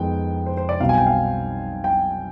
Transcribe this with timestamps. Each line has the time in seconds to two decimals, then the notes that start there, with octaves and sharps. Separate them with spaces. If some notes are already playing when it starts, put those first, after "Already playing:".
Already playing: F2 D#3 G#3 B3 G5
0.46 C5
0.57 C5
0.69 D5
0.80 B1 B2 G3 C4 F5
0.89 G#5
0.98 G5
1.07 F5
1.84 G5